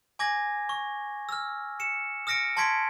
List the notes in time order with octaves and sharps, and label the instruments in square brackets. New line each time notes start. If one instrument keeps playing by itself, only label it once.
[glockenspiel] G#5 D6 G#6 A#6
C#6
E6 F6
C#7 E7
D#6 F6 A#6 C#7 D7
A5 C6 C#6 G#6 B6 D7